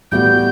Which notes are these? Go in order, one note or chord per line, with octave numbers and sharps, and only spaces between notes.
A2 G3 B3 F#4 G6